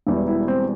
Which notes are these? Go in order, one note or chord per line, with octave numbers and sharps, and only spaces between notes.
E1 E2 E3 G3 E4
E4
C4